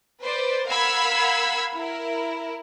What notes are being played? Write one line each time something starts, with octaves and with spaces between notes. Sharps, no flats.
B4 C5 D5
A#4 F5 F#5 B5 E6 G#6
E4 A#4